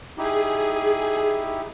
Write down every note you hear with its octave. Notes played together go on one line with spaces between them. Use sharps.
D#4 E4 G4 G#4